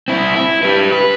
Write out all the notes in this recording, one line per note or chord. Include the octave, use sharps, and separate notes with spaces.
C4 E4
E4
G4 B4
B4